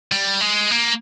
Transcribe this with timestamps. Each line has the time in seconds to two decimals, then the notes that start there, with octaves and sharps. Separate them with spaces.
0.12 G3
0.41 G#3
0.70 A#3